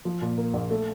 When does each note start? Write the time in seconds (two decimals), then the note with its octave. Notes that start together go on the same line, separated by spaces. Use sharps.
0.05 F3
0.22 A#2
0.38 A#3
0.54 A#1
0.71 A3